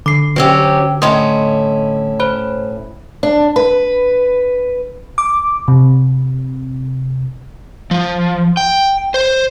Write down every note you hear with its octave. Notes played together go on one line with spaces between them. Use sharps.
D3 D6 C7
F#3 C#4 G4 C5 E6
A2 C#4 E4 D#5 C6 D#6
C5 C#5 B5
D4
B4
D6
C3
F3
G5
C5